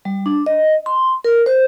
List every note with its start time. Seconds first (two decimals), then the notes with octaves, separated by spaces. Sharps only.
0.05 G3
0.26 D4
0.46 D#5
0.86 C6
1.25 A#4
1.46 C5